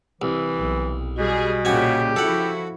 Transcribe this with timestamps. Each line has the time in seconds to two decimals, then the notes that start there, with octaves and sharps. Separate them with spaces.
0.22 C2 E3
0.56 B1
1.18 B2 G3 G#4
1.65 A#2 C#3 F#4 G4 G#5
2.16 F3 E4 F#4 A4 F#5